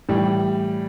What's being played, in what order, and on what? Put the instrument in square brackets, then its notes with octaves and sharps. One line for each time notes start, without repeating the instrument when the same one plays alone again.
[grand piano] A2 E3 G3